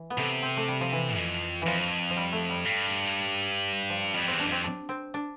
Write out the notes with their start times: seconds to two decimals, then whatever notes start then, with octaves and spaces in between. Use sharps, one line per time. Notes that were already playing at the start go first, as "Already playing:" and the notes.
Already playing: E3
0.10 B3
0.18 C3 A3
0.43 C4
0.57 A3
0.68 G3
0.81 F3
0.92 E3
1.16 F2
1.62 F2 E3 F3
2.10 F3
2.16 G3
2.32 A3
2.49 G3
2.65 G2
3.90 F3
4.14 F2 G3
4.28 E2 C4
4.40 D4
4.47 F2 C4
4.64 D4
4.89 C4
5.14 D4